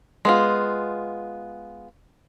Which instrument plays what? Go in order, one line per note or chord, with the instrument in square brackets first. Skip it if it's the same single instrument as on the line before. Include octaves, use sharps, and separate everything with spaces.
[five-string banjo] G#3 B3 F4